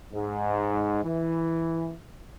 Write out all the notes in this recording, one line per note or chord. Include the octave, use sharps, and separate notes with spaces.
G#2
E3